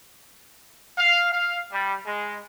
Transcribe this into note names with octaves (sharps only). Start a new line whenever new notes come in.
F5
F5
G3
G#3